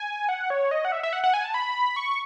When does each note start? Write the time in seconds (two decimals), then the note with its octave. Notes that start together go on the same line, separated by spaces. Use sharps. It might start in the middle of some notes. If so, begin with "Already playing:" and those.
Already playing: G#5
0.29 F#5
0.50 C#5
0.71 D#5
0.85 F#5
0.92 E5
1.03 E5
1.13 F#5
1.24 F#5
1.34 G#5
1.44 A5
1.54 B5
1.96 C#6